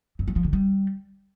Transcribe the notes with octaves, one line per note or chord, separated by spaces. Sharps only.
F#2
F#3
F3
D3
G3